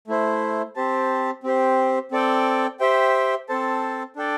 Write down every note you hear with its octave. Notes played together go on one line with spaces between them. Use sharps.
A3 E4 C5
C4 G4 C5 A5
C4 G4 C5
C4 A4 D5 G5
G4 C5 E5 G5
C4 A4 C5 A5
D4 A4 D5 G5